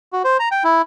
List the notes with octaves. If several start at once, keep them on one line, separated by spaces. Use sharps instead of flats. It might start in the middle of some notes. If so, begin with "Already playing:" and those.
F#4
C5
A#5
G5
E4